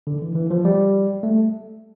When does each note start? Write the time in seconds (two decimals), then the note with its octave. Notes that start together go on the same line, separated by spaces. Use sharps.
0.07 D3
0.22 E3
0.35 E3
0.51 F3
0.65 G3
1.23 A3